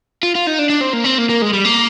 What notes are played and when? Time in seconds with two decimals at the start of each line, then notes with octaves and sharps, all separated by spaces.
0.23 F4
0.35 F4
0.47 D#4
0.59 D4
0.70 D4
0.81 C4
0.94 A#3
1.04 C4
1.18 A#3
1.29 A#3
1.42 G#3
1.53 G3
1.65 A#3